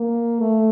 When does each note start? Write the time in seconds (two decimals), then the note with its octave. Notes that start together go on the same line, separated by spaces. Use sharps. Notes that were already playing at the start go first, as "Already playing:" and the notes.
Already playing: A#3
0.41 A3